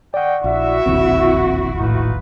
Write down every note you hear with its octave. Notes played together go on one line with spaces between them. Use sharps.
D5 D#5 F#5 G5 C#6
A#1 E4 F#4 E5
E1 A#1 D#2 C4
A2 D#4 F4 B4